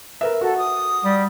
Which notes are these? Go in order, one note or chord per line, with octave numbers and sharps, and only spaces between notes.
A#4 B4 E5
F#4 A4
D#6
G3